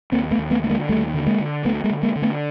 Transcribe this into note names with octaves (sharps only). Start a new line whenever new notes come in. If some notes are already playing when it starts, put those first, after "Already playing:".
D#2 A#3 C4
A3 B3
D#2
A3 B3
D3 A3
G#3 A#3
D#2 G3 A3
D3
G#3 A#3
D3
D2 A3 B3
G#3 A#3
D3
G#3 A#3
D3
A3 B3